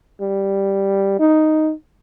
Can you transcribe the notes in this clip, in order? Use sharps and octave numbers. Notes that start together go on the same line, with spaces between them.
G3
D#4